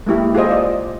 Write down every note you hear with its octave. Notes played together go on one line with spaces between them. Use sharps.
G#3 A#3 E4 G4
F4 G#4 A4 C5 D#5
D5 D#5